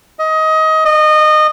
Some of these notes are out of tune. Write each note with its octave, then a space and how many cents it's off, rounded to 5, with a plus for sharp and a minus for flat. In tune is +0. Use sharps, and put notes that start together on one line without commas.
D#5 +20
D#5 -25